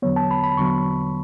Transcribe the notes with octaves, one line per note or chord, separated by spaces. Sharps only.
E2 D3 F#3 B3 C#5
A5
B5
B5
E2 D3 F#3 B3 C#6